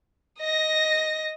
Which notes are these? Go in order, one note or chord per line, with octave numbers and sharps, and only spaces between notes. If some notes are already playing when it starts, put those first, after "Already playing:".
D#5 A#6